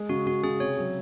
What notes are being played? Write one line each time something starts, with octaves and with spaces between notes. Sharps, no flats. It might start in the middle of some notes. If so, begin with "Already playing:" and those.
Already playing: G#3
C#3 F#4
C#3 F#4
C#3 G#4
C3 C#5
F#3